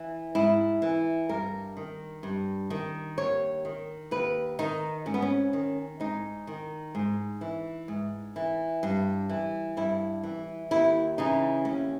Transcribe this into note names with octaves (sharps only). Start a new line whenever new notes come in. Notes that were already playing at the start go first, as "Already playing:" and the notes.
Already playing: E3
G#2 E4
E3
G2 A#4
D#3
G2
D#3
D#2 C#5
D#3
D#2 B4
D#3 D#4
G#2 C#4
B3
C#4
D#3
G#2 D#4
D#3
G#2
E3
G#2
E3
G2
E3
G2 E4
E3
D#2 E4
C#3 E3 D#4
D#2 C#4